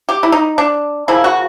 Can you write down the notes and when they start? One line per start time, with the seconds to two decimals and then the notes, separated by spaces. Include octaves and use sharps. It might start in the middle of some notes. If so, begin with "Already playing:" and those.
0.09 G4
0.23 E4
0.32 D#4
0.58 D4
1.08 C#3 F3 A#3 E4
1.24 F#4